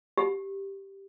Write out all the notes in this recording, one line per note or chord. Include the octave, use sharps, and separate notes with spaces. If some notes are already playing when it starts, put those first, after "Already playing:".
G4